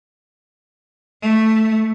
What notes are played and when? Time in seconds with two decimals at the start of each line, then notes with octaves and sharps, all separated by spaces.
1.22 A3